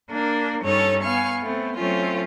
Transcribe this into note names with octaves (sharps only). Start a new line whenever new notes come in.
A#3 D4 A#4
G2 C#4 D#4 A4 C#5 A6
B3 F5 G#5 C#6 F6
A3 B3 C4
F#3 A3 C4 C#4 F4